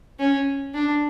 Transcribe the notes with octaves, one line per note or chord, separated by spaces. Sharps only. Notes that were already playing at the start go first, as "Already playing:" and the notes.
C#4
D4